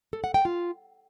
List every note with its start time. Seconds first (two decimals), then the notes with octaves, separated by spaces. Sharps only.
0.13 A4
0.24 F#5
0.34 G5
0.45 F4